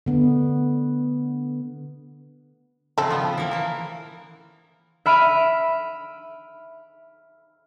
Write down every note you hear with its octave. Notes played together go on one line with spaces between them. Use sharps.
D3 B3
C#3 F3 C4 A4
F3 B3
E3 A#3
E3 A#3
E5 B5 F6 D7 D#7